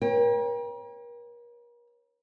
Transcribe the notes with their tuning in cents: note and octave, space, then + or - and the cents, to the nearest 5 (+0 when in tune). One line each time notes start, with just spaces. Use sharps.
A#4 +40 C#5 -25 G5 +25